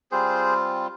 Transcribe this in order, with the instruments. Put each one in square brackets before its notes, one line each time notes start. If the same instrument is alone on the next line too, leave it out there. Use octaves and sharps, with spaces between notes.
[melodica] G3 C4 F4 G#4 C5